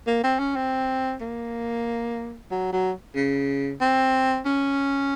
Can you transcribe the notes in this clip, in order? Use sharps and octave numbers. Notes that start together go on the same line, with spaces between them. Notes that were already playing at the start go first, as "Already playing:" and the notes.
A#3
C4
C#4
C4
A#3
F#3
F#3
C#3
C4
C#4